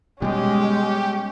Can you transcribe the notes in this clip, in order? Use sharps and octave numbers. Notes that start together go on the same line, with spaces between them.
B2 G3 G#3 C#4 G4